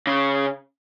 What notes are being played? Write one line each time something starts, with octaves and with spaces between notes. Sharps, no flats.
C#3